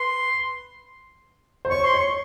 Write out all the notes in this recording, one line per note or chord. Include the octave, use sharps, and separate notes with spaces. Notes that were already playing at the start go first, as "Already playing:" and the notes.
Already playing: B4 C6
C5
C#5 C#6
C6
C#5
C#6